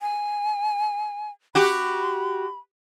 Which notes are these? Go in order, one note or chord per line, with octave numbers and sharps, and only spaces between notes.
G#5
F#4 G4 B5